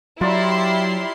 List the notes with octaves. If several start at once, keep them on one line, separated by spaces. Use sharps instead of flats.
F#3 E4 F4 G4 D5 A#5 C6